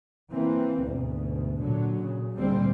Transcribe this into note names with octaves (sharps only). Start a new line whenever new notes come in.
E3 A#3 C4
D2 G#2 B2
A#2 D3 F#3
A#2 C#3
D2 A#2 D3 G3 G#3 C4